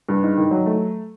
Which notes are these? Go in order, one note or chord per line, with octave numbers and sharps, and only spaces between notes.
G2
G#2
D#3
F#3
A3